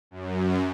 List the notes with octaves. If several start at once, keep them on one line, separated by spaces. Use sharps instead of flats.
F#2